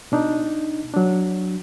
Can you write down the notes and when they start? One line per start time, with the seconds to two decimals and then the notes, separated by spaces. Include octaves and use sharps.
0.12 B2 D4 D#4
0.94 F#3 D4